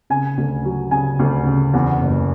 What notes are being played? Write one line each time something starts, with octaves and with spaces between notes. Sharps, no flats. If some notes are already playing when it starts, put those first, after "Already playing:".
C#3 G#5
D2
F#3
C#3 G#5
D2
C#3
E2 F#5
F#1